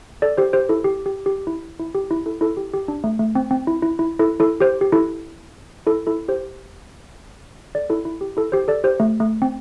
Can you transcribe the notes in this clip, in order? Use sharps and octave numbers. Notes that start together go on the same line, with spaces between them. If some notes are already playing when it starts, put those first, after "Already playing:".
A4 D5
G4 C5
G4 C5
E4 A4
G4
G4
G4
E4
E4
G4
E4
E4 A4
E4 A4
G4
G4
D4
A3
A3
C4
C4
E4
E4
E4
E4 A4
E4 A4
G4 C5
G4
E4 A4
E4 A4
E4 A4
G4 C5
A4 D5
E4 A4
E4
G4
E4 A4
G4 C5
A4 D5
G4 C5
A3
A3
C4